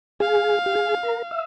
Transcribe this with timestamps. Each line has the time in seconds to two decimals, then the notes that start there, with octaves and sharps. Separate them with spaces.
0.20 G#4 F5
0.66 G4
0.75 G#4
1.03 A#4
1.31 E5